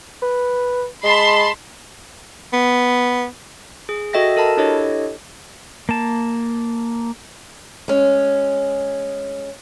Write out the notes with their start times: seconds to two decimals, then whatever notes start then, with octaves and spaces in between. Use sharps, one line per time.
0.22 B4
1.04 G#3 A5 B5 C6
2.53 B3
3.89 G#4
4.13 F#4 A4 D#5 E5 G5 A#6
4.36 F#4 A4 A#4 A5 B5
4.57 D4 E4 G4 A4 C#5 D#5
5.89 A#3 A5
7.88 G#3 C#4